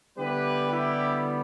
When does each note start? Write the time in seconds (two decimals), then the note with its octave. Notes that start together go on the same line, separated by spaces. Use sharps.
0.18 D3 G3 B3 E4 G4 B4
0.72 E4 G4